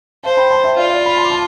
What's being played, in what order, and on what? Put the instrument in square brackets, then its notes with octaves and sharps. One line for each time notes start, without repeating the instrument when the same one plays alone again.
[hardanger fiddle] C5 [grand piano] F5 A5
[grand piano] G5 B5
A5 C6
E5 G5
[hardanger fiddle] F4 [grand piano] D5 F5
[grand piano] D5 F5
B5
A5 C6
D6
A5 C6